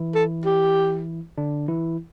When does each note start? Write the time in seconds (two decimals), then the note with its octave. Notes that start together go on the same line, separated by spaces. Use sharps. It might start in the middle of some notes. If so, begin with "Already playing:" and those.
Already playing: E3 E4
0.14 A4
0.45 G4
1.38 D3 D4
1.68 E3 E4